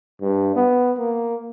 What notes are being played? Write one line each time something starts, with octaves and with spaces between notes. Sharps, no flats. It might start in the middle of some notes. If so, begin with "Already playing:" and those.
G2
B3
A#3